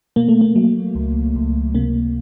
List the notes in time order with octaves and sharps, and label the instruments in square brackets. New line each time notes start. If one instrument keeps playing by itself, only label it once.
[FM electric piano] B2 A#3
A3
A#3
F#3
C#2
C#2
C3 A#3